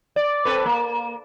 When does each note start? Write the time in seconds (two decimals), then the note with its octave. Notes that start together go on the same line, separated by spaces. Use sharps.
0.16 D5
0.45 C4 A4 B4
0.66 A#3